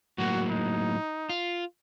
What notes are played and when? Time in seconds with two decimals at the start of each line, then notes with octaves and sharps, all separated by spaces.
0.18 A2 F#3 A#3 F#4
0.50 D#4
1.29 F4